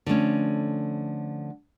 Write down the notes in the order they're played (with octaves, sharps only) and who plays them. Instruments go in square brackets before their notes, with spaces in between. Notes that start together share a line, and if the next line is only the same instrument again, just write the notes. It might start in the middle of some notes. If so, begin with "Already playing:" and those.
[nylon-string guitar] D3 F3 A3 C#4